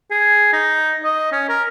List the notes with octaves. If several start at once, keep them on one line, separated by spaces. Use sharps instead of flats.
G#4
D#4
D#5
C#4
A#4